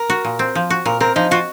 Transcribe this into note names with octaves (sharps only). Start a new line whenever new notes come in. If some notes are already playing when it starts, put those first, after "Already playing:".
Already playing: A#4
F#4
A#2
C4
F3
F#4
A#2 A#4
C4 A#4
F3 D#4
F4 F#4